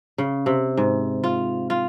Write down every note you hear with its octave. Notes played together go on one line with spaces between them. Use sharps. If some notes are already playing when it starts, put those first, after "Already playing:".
C#3
C3
G#2
F4
F4